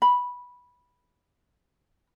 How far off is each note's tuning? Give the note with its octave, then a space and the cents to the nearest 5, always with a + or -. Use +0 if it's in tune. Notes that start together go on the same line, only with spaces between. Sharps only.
B5 -10